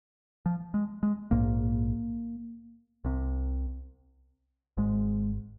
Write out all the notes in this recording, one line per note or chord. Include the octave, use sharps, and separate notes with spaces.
F3
G#3
G#3
A#1 G#2 A#3
C2 C3
G#1 G#2 G#3